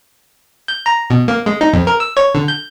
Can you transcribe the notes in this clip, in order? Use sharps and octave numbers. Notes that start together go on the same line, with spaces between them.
G6
A#5
B2
A#3
G#3
D#4
F2
A#4
E6
C#5
D3
G6